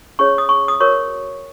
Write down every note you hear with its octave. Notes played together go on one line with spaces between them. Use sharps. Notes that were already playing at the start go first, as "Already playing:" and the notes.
C#4 G#4 C#5 C#6
D#6
C#6
D#6
F#4 A#4 C#5 C#6